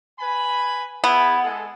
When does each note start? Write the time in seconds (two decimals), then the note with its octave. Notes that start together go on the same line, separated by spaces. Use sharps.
0.19 B4 G#5 B5
1.04 B3 E4 G#4
1.43 G#3 G#4 A4